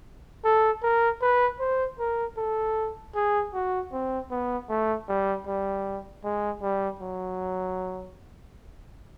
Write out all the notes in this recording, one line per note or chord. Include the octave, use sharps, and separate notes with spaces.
A4
A#4
B4
C5
A#4
A4
G#4
F#4
C4
B3
A3
G3
G3
G#3
G3
F#3